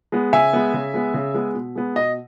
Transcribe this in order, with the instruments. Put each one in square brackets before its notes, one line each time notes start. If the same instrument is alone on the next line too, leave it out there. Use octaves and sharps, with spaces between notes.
[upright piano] G#3 B3
C#3 E5 G#5
G#3 B3
C#3
G#3 B3
C#3
G#3 B3
B2
G#3 B3
B2 D#5